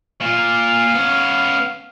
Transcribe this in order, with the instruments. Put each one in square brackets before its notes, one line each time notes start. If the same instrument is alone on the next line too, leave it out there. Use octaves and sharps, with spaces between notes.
[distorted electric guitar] A#2 F4 [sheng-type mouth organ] F5
[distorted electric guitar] B3 C#4